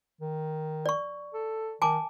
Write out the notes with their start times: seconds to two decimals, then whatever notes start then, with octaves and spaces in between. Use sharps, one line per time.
0.21 D#3
0.86 D5 C#6
1.34 A4
1.82 D#3 G#5 A5 D6